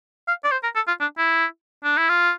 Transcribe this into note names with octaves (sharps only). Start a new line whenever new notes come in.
F5
D5
C5
A#4
A4
F4
D4
E4
D4
E4
F4